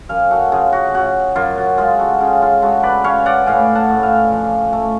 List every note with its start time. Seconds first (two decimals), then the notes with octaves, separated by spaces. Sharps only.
0.09 F#2 F5 G#5
0.31 F#4 A4
0.52 C#3 F4 G#4
0.72 F#4
0.95 C#3 F#4
1.36 F#2 F4
1.58 F#4
1.78 G#3 F4 G#4
1.99 F#4 A4
2.20 C#3 F4 G#4
2.41 F4 G#4
2.62 G#3 F#4 A4
2.83 B4 D5
3.04 C#4 C#5 F5
3.26 D5 F#5
3.46 A2 F5 G#5
3.75 F#5 A5
3.89 A2
4.03 F5 G#5
4.31 F3
4.73 A3